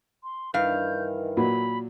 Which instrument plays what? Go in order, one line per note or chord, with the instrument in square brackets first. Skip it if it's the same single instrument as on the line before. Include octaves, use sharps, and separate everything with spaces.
[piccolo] C6
[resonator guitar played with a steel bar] G2 F5 [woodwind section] D#3 E3 [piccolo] G6
[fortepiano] A#2 F#3 [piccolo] B5